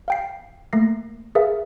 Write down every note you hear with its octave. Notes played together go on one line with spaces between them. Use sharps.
F5 G5 C7
A3 A#3 A#6 C7
G#4 A#4 B4 E5 F5